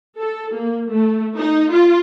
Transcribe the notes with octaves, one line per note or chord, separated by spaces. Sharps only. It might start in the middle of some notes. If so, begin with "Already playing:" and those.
A4
A#3
A3
D#4
F4